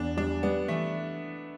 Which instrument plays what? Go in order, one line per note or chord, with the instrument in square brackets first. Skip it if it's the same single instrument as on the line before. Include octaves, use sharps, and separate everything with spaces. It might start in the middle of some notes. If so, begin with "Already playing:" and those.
Already playing: [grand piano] E2 [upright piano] D4
[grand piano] G3 [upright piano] D4
[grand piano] G3 [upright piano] B3
[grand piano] E3 [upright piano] A3